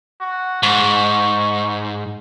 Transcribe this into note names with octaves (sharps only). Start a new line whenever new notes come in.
F#4
G#2 C#6